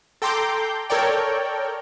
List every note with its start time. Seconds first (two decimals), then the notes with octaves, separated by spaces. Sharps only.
0.22 A4 G5 A#5 C6 D6 G6
0.90 A4 A#4 C#5 D5 G5